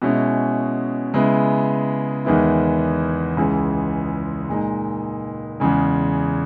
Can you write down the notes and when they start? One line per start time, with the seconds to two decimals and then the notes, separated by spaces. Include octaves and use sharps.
0.02 B2 G#3 C#4 E4
1.14 C#3 G#3 B3 E4
2.25 E2 D#3 G#3 B3 E4
3.37 C#2 C#3 E3 G#3
4.49 A#2 G#3 D#4
5.60 E2 C#3 G#3